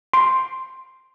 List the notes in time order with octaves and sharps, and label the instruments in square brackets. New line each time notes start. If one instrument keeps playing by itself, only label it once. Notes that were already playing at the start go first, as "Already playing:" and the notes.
[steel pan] C6